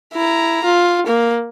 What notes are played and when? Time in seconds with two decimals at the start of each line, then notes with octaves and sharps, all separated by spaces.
0.13 E4 A#5
0.64 F4
1.06 A#3